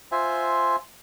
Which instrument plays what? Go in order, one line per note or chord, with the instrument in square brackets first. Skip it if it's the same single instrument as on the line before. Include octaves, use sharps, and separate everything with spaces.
[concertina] F4 C5 E5 G#5